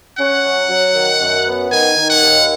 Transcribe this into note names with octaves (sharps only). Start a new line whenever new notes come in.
C#4 F#5
F#3
F#3
D#3
F#2
B3
D#3 G#5
D#3
F#5
D#2